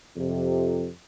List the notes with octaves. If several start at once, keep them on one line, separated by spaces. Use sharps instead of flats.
F2 C3